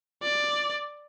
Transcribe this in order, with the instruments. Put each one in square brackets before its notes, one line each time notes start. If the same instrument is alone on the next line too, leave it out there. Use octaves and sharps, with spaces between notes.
[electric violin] D5